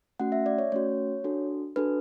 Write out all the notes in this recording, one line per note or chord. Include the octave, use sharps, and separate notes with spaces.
A3 C#4 F#4 F#5
E5
D5
C#5
A3 C#4 F#4 C#5
D4 F#4 A4
D4 F#4 A4 B4